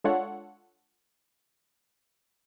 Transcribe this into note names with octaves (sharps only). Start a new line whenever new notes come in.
G#3 D4 F4 A4 C#5 F#5